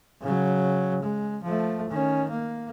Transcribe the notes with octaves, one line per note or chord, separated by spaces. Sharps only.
C#3 F#3
G#3
F3 A3
D#3 C#4
A#3